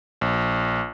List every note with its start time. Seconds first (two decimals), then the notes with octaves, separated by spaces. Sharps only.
0.21 A#1